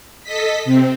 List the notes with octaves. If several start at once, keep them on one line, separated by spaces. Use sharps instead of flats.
A4 D#5 B6
C3 C4